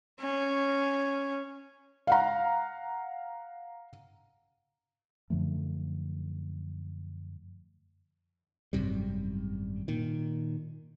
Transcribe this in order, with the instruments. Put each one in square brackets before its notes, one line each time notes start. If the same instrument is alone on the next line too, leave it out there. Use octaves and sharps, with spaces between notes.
[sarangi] C#4
[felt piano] F5 F#5 A#5
[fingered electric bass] F#2 D3 F3 A3
G#1 F#2 C3 G3
A#2 D#3